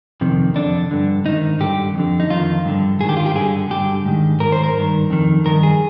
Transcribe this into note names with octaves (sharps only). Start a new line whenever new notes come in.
F2 C3 D#3
F2 D3 D4
G2 D3
G#2 D#3 D#4
G2 D3 G4
F2 D3
D#4
F2 D#3 F4
G2 D3
G#2 D#3 G#4
G4
F4
G4
G2 D3 G#4
G2 D3 G4
G#2 D#3
G#2 D#3 A#4
C5
A#4
G2 D#3
F2 D#3
G2 D#3 A#4
G#4